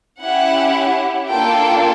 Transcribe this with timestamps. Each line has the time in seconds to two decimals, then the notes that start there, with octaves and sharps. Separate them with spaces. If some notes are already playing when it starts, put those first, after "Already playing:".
0.21 C#4 E4 G4 F#5
1.28 A#3 D4 F4 A4 G5